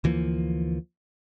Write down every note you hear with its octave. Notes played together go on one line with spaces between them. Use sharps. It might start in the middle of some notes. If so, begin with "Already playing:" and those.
D2 E3 F3 A#3